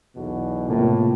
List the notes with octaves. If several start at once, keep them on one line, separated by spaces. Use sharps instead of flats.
B1 E2 B2
E2 A2 C3 A#3 F4